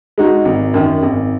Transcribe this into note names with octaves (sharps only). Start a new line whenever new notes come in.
G#3 D#4 F#4
G#1
F#2 D#3
G#1